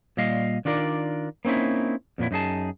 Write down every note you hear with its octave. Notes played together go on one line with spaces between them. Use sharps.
A#2 G3 D#5 F5
D#3 D4 F4 A#4 D5
A#3 C4 C#4 D#4 E4
F2 A#2 F#3 E4
F#2 D#4 G#4 A5